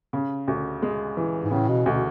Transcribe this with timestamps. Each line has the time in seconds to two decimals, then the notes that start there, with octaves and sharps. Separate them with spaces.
0.13 C#3
0.48 D2
0.82 G#3
1.17 E3
1.44 G#2
1.51 A2 C#3
1.69 B2
1.86 D2 B2